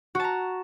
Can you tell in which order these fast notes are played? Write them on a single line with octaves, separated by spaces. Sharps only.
F#4 A5 A#5